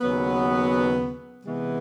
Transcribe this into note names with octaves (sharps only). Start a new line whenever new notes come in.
D#2 C#3 F#3 B3
C3 E3 G#3 B3